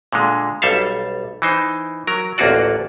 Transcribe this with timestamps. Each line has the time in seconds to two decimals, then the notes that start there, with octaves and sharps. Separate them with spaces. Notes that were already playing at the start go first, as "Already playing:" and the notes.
0.13 A#2 D3 G#3
0.62 B1 G3 A4 E5 F5
1.42 E3 D#4 C5
2.07 F#3 A#4 A#5
2.38 A1 D2 A#3 F4 F#4 D5